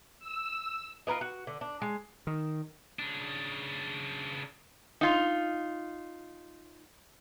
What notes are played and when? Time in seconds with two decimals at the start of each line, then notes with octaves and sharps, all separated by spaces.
0.19 E6
1.07 F4 A#4 B4 D#5
1.21 F#4
1.47 D3
1.61 D4
1.82 G#3
2.27 D#3
2.99 C#3 D4
5.01 D#4 F4